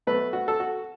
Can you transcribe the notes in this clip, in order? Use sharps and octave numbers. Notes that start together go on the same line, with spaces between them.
B2 F#3 A3 B4
F#4
A4
F#4